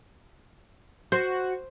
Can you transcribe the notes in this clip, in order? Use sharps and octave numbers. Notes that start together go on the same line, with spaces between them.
F#4 C5